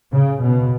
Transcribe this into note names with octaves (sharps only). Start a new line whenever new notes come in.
C#3
B2